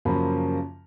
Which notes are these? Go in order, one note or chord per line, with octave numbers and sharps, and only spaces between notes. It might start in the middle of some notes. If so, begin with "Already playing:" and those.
F#2 C#3 F3 A#3 C#4 B5